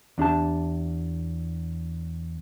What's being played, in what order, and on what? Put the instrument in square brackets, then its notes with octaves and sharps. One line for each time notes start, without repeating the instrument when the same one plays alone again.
[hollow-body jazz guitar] E2 D4 G4 A5